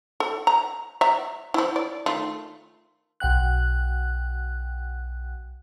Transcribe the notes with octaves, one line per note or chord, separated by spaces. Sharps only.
A4
A#5
E5 A#5
F3 E4
D5
D#3 A3 F4
B1 F#5 G5 F#6